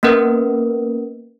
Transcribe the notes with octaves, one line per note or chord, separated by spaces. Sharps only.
A#3 B3 C#4 A#4 B4